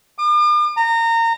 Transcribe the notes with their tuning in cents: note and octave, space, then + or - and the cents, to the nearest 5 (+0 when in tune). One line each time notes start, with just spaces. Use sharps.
D6 +45
A#5 -25